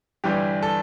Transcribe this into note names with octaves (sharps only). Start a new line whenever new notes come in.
G1 G2 E3 G3 G4
A4